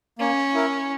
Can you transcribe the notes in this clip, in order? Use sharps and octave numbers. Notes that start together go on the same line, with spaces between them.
A#3 C#4
E4 A#4